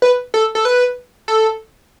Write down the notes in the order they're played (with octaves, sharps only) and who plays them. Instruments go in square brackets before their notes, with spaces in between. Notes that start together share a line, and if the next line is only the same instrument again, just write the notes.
[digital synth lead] B4
A4
A4
B4
A4